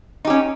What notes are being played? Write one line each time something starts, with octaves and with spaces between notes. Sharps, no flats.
C#4 D#4 G4